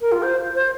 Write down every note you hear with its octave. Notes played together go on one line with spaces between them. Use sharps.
A#4
F4
C5
C5